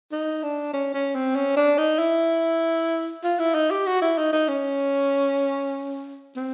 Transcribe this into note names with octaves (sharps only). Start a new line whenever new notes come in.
D#4
D4
C#4
C#4
C4
C#4
D4
D#4
E4
F4
E4
D#4
G4
F#4
E4
D#4
D#4
C#4
C4